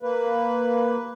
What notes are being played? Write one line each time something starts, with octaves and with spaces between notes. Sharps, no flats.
A#3 B4